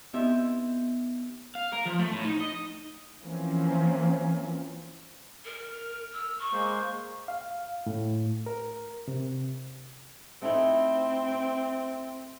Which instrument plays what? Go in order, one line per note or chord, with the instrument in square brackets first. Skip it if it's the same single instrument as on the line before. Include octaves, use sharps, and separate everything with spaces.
[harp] B3 C4 D#4 E4 G4 E5
[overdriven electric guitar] F5
A#4
F3
A3
A2
D#4
D#5
[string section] E3 F3 A#3 C4 C#4
[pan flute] A#4
[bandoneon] F6
[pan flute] E6
C#6
[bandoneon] G#3 A#3 C5
[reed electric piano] F5
A2
A#4
C3
[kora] A3 D#4 E4 [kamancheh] C4
[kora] C5